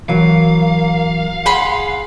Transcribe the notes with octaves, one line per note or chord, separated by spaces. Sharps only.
E3 F#3 A#3 F5
G#4 F#5 B5 C6